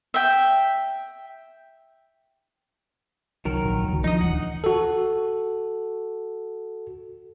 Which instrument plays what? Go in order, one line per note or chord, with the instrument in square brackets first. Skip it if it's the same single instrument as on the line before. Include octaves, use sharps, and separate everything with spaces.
[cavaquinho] E5 G5
[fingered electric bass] C2 [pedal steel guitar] D#3 F#3 A#4
[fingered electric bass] A#1
D#1 C#2
[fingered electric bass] F3 D4 [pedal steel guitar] D#4 D#5
[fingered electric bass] D1 E3 [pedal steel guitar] F#5
[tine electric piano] F#4 A4